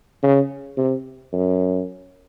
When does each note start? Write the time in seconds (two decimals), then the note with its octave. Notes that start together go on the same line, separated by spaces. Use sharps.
0.23 C#3
0.77 C3
1.33 F#2